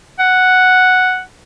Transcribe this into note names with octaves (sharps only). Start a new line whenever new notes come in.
F#5